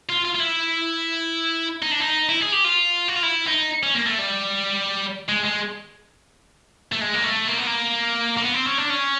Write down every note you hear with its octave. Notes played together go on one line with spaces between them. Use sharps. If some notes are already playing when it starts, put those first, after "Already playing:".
F4
F4
F4
E4
D#4
D4
D#4
E4
G#4
G4
F4
F#4
F4
E4
D#4
C#4
A#3
A3
G3
G#3
G#3
A3
G#3
A#3
A3
A#3
B3
A#3
A#3
B3
C4
C#4
D4
C#4